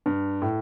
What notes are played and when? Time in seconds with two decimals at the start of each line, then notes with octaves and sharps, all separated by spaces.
0.06 G2
0.42 A2